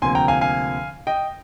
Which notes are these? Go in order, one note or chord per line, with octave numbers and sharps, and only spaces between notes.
D2 C3 F3 A#3 G#5 C6
G5 A#5
F5 G#5
F5 G#5
D#5 G5